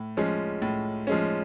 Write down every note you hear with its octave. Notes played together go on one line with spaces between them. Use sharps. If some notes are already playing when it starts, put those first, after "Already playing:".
Already playing: A2
F3 G#3 C#4
A2
F3 G#3 C#4